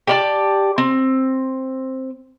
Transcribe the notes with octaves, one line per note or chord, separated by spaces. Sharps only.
G4 D5 A5
C4